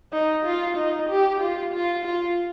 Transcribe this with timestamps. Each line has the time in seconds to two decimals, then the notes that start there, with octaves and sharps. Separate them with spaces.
0.13 D#4
0.46 F4
0.77 D#4
1.10 G4
1.41 F4
1.74 F4
2.05 F4